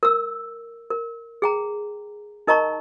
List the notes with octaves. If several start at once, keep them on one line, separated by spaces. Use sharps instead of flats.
A#4 E6
A#4
G#4 G5 A#5
D#4 A#4 D#5 A5 A#5 C#6